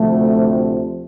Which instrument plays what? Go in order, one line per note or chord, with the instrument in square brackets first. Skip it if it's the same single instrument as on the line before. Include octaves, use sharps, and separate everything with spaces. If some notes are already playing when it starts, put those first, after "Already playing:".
Already playing: [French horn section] D2 C3 F3 A3